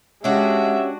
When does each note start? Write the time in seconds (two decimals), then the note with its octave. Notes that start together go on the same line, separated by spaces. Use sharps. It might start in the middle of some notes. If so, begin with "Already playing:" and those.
0.24 G#3 C#4 D4 F#4 G4 E5